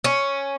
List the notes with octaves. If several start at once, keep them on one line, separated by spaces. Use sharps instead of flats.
C#4